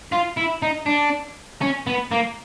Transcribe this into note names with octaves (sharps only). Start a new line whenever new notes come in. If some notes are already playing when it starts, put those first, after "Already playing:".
F4
E4
D#4
D4
C#4
B3
A#3